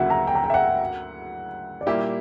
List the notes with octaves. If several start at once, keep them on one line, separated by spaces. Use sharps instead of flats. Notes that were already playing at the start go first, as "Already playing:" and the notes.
Already playing: D2 C#3 F#3 A#3 E4 E5 F#5
A#5
G5
A#5
G5
E5
F#5
D5
A#2 G3 A#3 E4 G4 E5